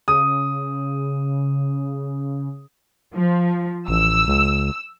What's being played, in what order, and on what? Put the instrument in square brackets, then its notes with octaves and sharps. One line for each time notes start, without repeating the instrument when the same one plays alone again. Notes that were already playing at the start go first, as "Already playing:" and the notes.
[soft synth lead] C#3 [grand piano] D#6
[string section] F3
[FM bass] A1 [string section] E6
[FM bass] C#2